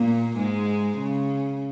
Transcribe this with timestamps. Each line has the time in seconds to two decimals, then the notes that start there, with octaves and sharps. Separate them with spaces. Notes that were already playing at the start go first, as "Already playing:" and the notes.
Already playing: A#2 A#3
0.36 G#2 G#3
0.98 C#3